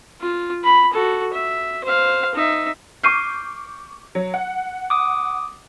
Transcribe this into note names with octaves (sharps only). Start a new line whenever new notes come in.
F4
B5
F#4 A4
E5
C5 F5
D#4 E5
C#6 D6 F6 G6 C7 D#7
F#3
F#5
D6 D#6